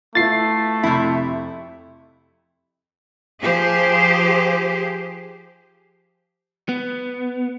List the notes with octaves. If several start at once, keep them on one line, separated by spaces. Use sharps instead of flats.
A3 B3 E4 F4 A6 C7
F2 C3 E4
F3 G4 G#4 C5
B3